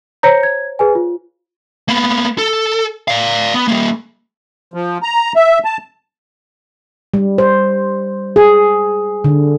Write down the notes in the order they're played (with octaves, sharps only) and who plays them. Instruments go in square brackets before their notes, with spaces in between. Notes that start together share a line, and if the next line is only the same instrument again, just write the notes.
[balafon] C5 C#5 A#5 [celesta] G6 A#6 C#7
[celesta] G#6
G#4 B4 G#5
F4
[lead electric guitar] A#3 B3
A4
D5 F5
B3
G3 A#3
[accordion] F3
A#5
E5
A5
[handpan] G3
C5
G#4
D3